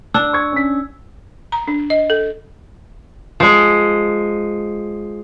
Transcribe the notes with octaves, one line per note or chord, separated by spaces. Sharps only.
D4 E6
C#6 G#6
C#4 B6
A#5
D4
D#5
A4
F3 G#3